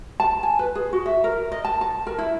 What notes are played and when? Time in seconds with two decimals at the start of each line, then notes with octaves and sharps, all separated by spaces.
0.20 A5
0.43 G#5
0.59 B4
0.75 G#4
0.93 F#4
1.06 E5
1.24 A#4
1.52 D#5
1.65 A5
1.81 A5
2.07 A#4
2.18 E4